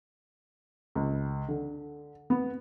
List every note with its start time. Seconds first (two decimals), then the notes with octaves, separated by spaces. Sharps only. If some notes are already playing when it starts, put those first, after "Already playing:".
0.95 C#2
1.48 D3
2.30 B3